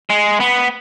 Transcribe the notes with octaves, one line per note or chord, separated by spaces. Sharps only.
G#3
B3